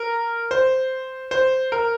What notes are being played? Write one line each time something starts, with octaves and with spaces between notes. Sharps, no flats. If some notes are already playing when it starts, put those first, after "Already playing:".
Already playing: A#4
C5
C5
A#4